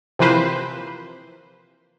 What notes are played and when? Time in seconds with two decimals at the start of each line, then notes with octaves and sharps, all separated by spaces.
0.19 C3 E3 F3 A#3 B4 C5